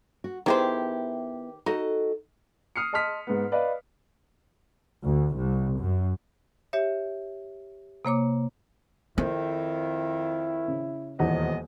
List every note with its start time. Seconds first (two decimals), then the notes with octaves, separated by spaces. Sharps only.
0.24 F#4
0.46 D#3 B3 E4 G4 G#4 C5
1.66 D#4 F#4 A4 D#5
2.76 D#6 F6 C7 C#7
2.93 D#5 A5 C6 D#6 F6 B6
3.27 G#2 B3
3.52 B4 D5 D#5 F5
5.03 D2
5.36 C2
5.79 F#2
6.73 G4 C#5 E5
8.05 C3 A#3 C#5 D6
9.18 F2 D#3 C4 E4
10.68 C#3
11.19 D#1 E2 C3 B3 D#5 F#5